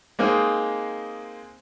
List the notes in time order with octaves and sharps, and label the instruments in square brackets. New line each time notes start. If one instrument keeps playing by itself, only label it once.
[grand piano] G#3 A#3 C4 D#4 G#4